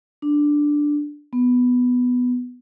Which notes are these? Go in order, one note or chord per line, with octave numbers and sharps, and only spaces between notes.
D4
B3